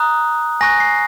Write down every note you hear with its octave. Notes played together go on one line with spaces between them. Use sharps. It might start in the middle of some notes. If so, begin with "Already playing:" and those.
Already playing: A#5 D#6 F#6
G#5 C#6 F#6 A#6
C7